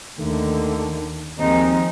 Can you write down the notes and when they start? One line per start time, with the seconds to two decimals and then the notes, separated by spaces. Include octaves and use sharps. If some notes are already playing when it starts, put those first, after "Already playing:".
0.19 D#2 D3 D#3 A3
1.38 D#2 F3 G#3 C4 D#4